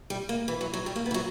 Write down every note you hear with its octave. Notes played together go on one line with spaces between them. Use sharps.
G3
A#3
E3
F#3
F#3
G3
A#3
B3
E3
F#3